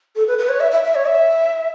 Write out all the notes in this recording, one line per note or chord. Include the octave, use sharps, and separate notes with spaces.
A4
B4
B4
C#5
E5
E5
E5
C#5
E5